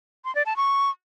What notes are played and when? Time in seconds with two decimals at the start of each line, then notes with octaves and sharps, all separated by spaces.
0.25 C6
0.35 D5
0.46 A5
0.56 C#6